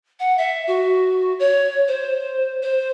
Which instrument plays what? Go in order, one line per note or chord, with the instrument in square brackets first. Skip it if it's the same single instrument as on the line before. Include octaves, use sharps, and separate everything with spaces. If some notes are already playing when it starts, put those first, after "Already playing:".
[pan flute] F#5
E5
F#4
C#5
C5
C5